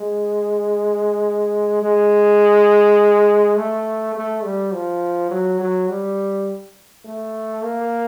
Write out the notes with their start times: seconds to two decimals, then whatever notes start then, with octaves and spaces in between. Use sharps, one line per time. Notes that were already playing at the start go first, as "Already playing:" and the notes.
Already playing: G#3
1.83 G#3
3.56 A3
4.15 A3
4.44 G3
4.73 F3
5.31 F#3
5.60 F#3
5.89 G3
7.05 A3
7.63 A#3